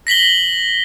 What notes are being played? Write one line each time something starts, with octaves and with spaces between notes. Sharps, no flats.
A#6 B6 F#7 G7